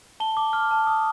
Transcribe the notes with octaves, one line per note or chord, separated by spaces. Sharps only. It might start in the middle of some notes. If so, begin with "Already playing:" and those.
A5 G7
D6
F6
A5
D#6